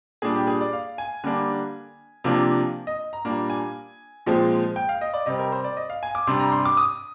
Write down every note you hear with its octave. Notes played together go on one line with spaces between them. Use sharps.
A#2 G3 D4 G#4
G4
G#4
D5
F5
G#5
D3 G3 A#3 D4 G#5
C3 F3 A#3 D4
D#5
A#5
A#2 G3 A#3 D4 A#5
G#5
A#2 F3 G#3 C4
G5
F5
D#5
D5
C3 G3 C4 D#5
A#4
C5
D5
D#5
F5
G#5
D6
C3 G3 D4 C6
A#5
C6
D6
D#6